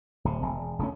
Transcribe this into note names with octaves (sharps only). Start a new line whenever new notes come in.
D1 C3
E1
E1 C#3 A3 C#4